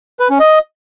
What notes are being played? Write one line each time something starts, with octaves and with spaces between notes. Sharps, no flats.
B4
C#4
D#5